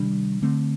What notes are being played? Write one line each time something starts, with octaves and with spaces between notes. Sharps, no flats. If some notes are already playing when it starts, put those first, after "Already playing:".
Already playing: C3 D#3 G3 D4
D3 A3 C4